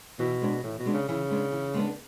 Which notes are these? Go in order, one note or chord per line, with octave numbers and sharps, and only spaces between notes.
B2 E3
G#3 B3 D4
A2 E3
B2
G#3 B3 D4
C#3
C#3 E3
G#3 B3 D4
E3
G#3 B3 D4